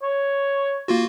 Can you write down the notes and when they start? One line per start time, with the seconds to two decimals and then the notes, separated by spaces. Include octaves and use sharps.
0.02 C#5
0.88 A#3 F4 F#4